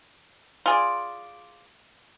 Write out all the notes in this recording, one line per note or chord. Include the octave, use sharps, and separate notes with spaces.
F4 G#4 D5